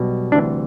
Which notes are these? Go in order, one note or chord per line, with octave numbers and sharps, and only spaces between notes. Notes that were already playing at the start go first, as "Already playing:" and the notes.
Already playing: B1 B2 G3
D2 C3 E3 G3 D4